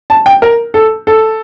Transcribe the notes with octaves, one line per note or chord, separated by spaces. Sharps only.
A5
G5
A#4
A4
A4